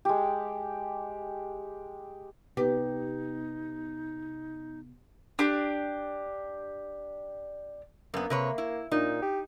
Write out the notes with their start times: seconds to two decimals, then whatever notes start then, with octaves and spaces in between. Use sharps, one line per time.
0.05 G#3 G4
2.57 C3 B3 D#4 G4 B4
5.39 D4 G4
8.14 F#2 A#3 B3
8.30 C3 B4 C#5
8.58 E4
8.91 A#2 D#4
9.22 G4